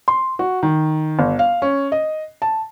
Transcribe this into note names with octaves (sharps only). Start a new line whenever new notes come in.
C6
F#4
D#3
G1
F5
C#4
D#5
A5